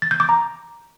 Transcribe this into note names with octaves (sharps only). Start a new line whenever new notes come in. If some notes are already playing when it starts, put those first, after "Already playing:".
A6
G6
D6
A#5